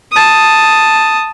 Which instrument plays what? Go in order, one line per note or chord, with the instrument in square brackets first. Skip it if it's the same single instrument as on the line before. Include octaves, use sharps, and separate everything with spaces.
[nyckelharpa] A5 D#6